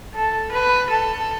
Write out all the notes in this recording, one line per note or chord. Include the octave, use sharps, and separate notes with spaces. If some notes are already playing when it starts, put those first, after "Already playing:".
A4
B4
A4